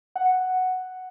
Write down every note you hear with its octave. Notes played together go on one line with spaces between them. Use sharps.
F#5